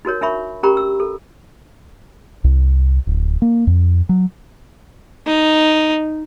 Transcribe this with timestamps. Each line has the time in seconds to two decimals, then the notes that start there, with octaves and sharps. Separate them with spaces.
0.05 D#4 F#4 A#4 C#5
0.21 D4 A#4 E5 B5 C#6
0.63 C#4 G4 A#4 A#5 B5 C#6
0.77 E6
1.00 A4
2.44 C2
3.07 D1
3.42 A#3
3.67 F2
4.09 F#3
5.26 D#4